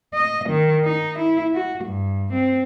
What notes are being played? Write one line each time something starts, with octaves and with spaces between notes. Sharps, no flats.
D#5
D#3
D#4
E4
F#4
G2
C4